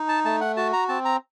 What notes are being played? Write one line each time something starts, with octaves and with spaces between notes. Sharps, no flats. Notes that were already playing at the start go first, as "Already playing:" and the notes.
Already playing: D#4
A5
A3 A5
F#5
F#4 A5
A#5
C4 A5
A#5